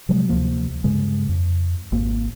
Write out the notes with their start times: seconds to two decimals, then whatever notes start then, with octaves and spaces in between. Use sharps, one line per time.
0.09 C3 F3 F#3 G#3
0.29 D2 C3 F3 A#3
0.84 G2 C#3 G#3
1.29 F2
1.92 G#1 A#3